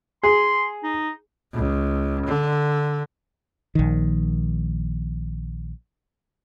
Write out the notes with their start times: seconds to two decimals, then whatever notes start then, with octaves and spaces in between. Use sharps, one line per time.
0.23 G#4 C6
0.83 D#4
1.53 C#2
2.26 D3
3.75 A#1 D#3